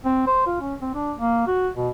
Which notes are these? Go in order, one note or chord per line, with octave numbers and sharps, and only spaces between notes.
C4
C5
F4
C#4
C4
D4
A#3
F#4
B2